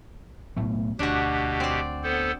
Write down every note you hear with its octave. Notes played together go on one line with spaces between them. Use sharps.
B1 A2 A3
D2 B2 D4 F#4 G4
C4 D5
B3 A4 C5